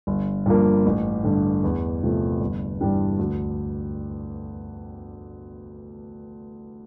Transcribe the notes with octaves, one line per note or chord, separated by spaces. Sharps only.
G1
G2 F3 A#3
A1
G2 D3
E2
C3 F3 A3
G1
G2 E3 G3 D4
D2